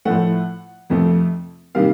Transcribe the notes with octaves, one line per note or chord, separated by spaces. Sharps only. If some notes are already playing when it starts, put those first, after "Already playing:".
A2 F3 A3 F#5
F2 C3 F3 A3
C3 D#3 G3 A#3 F5